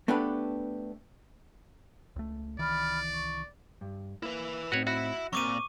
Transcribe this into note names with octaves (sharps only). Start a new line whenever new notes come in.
A3 B3 D4 G4 A4 B4
C#2 A3
C2 D#3 E3 D5 B5 F6
C#6
G2
A#3 E4 B4
A2 C4 D#4 F#4 B4 C#5
F#4 E5 B5
A#2 F#3 C4 C#6 D6 D#7